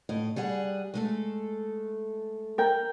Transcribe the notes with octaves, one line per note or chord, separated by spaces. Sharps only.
A2 D#5
G3 G#4 F#5
G#3 A3 A4
A#4 G5